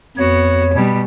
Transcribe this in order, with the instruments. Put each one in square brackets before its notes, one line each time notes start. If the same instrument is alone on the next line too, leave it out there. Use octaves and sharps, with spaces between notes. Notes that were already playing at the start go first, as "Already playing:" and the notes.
[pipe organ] F2 C#5 [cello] B3 F#4
[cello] B2 G3